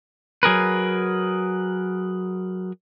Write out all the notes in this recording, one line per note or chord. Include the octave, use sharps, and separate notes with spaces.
F#3 G#4 A#4 B4